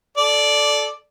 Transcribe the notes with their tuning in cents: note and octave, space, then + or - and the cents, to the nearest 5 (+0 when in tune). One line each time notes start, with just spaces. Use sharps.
A4 -20 D5 +0